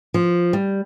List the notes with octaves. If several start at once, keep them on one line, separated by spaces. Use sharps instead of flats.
F3
G3